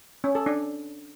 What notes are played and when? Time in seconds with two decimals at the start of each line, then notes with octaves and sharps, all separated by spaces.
0.24 C#4
0.35 A4
0.46 D4